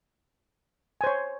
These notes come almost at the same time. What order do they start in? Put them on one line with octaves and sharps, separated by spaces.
G#5 C5 C#5